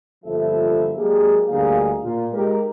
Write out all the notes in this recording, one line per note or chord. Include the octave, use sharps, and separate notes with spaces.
G1 A#2 F3 E4 A4 E5
F#3 G#3 A#3 D4 G4 G#4
D2 G3 A#3 D#4 G#4 F5
A#2 F4
G#3 D#4 G4 A#4